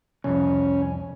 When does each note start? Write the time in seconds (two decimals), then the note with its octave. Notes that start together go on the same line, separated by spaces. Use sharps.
0.24 C2 F2 C#4